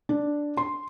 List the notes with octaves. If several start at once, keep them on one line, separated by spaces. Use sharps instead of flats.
D4
C6